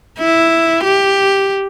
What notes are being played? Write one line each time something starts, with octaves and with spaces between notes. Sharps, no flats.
E4
G4